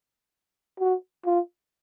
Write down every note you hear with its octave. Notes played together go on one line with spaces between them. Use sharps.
F#4
F4